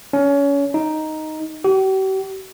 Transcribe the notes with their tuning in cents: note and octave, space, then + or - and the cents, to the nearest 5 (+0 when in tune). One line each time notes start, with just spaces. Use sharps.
C#4 +25
D#4 +0
G4 -45